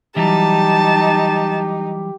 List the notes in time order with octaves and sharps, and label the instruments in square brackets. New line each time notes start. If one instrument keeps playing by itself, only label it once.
[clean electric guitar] E3 F#3 G3 [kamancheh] D#4 [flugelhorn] G4 [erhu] A5